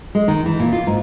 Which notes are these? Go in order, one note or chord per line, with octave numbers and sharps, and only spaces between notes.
G#3
D#3
E3
A#2
F4
G#2